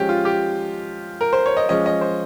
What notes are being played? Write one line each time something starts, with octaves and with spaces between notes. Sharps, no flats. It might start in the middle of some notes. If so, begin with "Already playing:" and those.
Already playing: F3 G#3 C#4 G4
F4
G4
A#4
C5
C#5
D#5
F3 G#3 C#4 D#5
D#5
C5